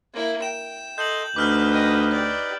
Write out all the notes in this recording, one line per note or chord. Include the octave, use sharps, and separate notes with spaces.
A#3 E4
G5 E7
A4 D#5 C6 G6 F#7
D2 D#4 B4 D6 F6 G6
D#5 G5
G4 D5